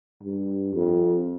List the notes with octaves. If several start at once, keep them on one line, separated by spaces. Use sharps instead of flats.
G2
F2